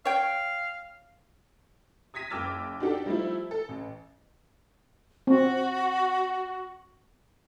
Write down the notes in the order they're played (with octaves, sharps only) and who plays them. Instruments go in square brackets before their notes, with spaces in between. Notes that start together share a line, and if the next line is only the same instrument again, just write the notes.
[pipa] C#5 G5 [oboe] F5
[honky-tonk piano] D#6 G#6 A#6 B6 D#7
F#1 G5 D6 E6 F6 A6
D4 D#4 F#4 G4 A4 D5
F3 G3 A3 D#4 E4
A4
A1
[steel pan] C4 [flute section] F#4